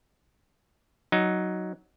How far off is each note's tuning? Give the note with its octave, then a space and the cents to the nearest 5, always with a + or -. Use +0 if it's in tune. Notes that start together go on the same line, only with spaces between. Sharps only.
F#3 +0 D#4 +0